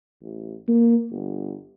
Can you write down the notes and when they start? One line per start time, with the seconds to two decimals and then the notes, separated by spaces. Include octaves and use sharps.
0.23 A1
0.68 A#3
1.11 G1